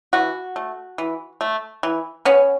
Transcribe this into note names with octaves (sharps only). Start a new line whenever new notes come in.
E3 F#4
A3
E3
A3
E3
B3 C#4